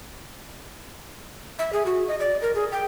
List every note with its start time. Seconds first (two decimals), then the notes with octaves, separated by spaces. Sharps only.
1.59 E5
1.73 G#4
1.86 F#4
2.08 D#5
2.20 D5
2.42 A#4
2.55 G#4
2.72 G5